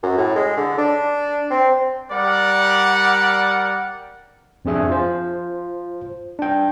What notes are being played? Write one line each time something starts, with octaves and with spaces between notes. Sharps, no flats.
F#2
A2
G#3
D3
D4
C4
G3 A#4 D5 F#5
F2 C4 D4 G#4 E5 G#5
F4 C5
D4 G5